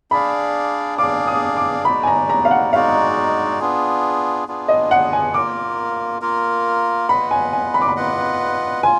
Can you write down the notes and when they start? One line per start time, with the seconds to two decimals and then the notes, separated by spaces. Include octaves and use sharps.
0.11 D4 G#4 D5 F5 B5
0.98 D4 G#4 D5 F5 D6
1.27 D#6
1.57 D6
1.85 G#3 D#4 F#4 D5 B5
2.03 G#5
2.07 A#5
2.29 A#5
2.45 F5
2.51 F#5
2.73 G#3 D#4 F#4 D5 F5
3.60 B3 D4 F4 G#4
4.47 B3 D4 F4 G#4
4.68 D#5
4.91 F#5
5.13 G#5
5.34 A#3 F4 A#4 D6
6.22 A#3 F4 A#4
7.08 F4 B4 D#5 F#5 B5
7.31 G#5
7.53 G#5
7.74 B5
7.82 D6
7.88 B5
7.96 F4 B4 D#5 F#5
8.83 F4 G#5